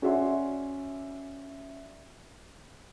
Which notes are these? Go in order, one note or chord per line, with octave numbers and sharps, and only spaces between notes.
C#4 F#4 D5 E5 C6